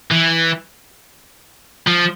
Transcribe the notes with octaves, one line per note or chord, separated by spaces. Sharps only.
E3
F3